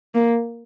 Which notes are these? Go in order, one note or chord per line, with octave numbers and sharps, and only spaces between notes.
A#3